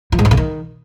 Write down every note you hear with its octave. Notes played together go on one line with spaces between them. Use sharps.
F3
G#2
E3
C#3
D#3